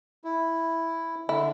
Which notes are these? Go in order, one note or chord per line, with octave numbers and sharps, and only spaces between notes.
E4
D3 E4